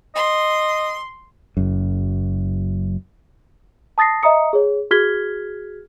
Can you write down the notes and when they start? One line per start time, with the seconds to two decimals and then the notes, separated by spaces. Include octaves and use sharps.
0.15 D#5 C6
1.57 F#1 F#2
3.98 A5 D#6 A6 A#6 C7
4.23 D#5 E5 A#5 D#6 C#7
4.53 G#4 C#5
4.91 F#4 G#4 F6 G#6 B6 G7